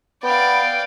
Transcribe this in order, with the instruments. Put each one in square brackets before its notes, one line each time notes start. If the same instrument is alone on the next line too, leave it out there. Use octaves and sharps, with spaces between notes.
[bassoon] B3 [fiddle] D5 F5 [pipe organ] G5